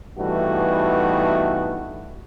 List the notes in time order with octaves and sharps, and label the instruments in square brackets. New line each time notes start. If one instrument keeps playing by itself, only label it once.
[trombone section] G2 E3 A3 B3 D#4 F#4